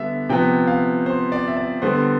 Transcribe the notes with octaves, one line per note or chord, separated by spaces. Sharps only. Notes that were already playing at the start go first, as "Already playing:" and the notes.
Already playing: D3 G3 B3 E5
C3 F3 B3 G5
F5
C5
D5
E5
D5
D3 G3 B3 C5